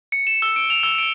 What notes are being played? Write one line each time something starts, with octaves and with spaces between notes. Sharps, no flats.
C#7
E7
E6
D7
F7
E6
D7